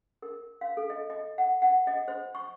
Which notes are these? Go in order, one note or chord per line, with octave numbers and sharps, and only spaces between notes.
A#4
F5
A4
D#5
D#5
F#5
F#5
D#5
C5
C#6